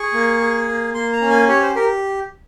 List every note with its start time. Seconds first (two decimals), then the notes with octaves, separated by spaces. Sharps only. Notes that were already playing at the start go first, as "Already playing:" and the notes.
Already playing: G#4 C#6
0.14 A#3
0.40 G#4
0.68 A#3
0.94 A#3 C6
1.13 A#5
1.21 C#4
1.30 G#5
1.48 G4 C#5
1.62 C5
1.75 G4 A#4